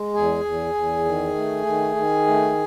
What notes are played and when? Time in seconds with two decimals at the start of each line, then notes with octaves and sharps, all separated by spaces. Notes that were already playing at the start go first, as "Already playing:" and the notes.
Already playing: G#3
0.14 E2 G#4 G#5
0.45 E2
0.74 E2
1.05 D#3
1.35 A3
1.66 D#3
1.96 D#3
2.27 A3